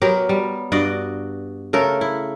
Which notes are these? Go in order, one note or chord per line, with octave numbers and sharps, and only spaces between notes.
F#3 B3 G4 A#4
G3
G2 F#4 D5 D#5
C#3 A3 A4 A#4
E4